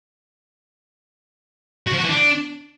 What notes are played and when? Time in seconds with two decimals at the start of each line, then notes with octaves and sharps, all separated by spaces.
1.87 F#4
1.93 F3
1.98 F#4
2.03 E3
2.09 D4